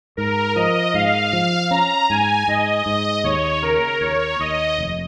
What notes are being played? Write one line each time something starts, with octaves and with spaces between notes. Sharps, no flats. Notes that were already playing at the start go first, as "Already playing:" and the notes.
G#2 A#4
F3 D#5
G#2 F5
F3
C#4 A#5
G#2 G#5
G#2 D#5
G#2
D#2 C#5
C#3 A#4
D#2 C#5
D#2 D#5
F1